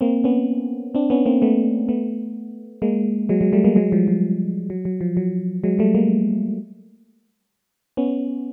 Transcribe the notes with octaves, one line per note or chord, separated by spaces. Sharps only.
A#3 C4
B3 C#4
C4 D4
B3 C#4
A#3 C4
A3 B3
A3 B3
G#3 A#3
F#3 G#3
F#3 G#3
G3 A3
G#3 A#3
F#3 G#3
F3 G3
F3
F#3
F#3
F3
F#3
F#3 G#3
G3 A3
G#3 A#3
B3 C#4